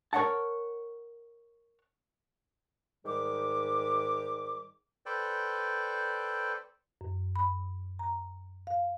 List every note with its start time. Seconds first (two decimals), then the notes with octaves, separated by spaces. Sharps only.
0.13 A#4 C#5 D#5 F#5 A5
3.05 G#2 D#3 G3 D6
5.06 A4 B4 C5 D5 G5
7.01 F#2
7.36 B5
7.99 A#5
8.67 F5